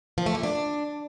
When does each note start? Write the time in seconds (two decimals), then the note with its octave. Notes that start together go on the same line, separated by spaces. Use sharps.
0.18 F3
0.26 A3
0.35 A#2
0.43 D4